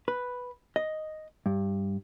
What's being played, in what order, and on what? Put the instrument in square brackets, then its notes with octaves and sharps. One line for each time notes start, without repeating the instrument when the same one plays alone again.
[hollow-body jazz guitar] B4
D#5
G2